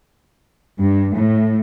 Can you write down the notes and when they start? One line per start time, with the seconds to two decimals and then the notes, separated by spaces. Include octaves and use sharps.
0.80 G2
1.15 A2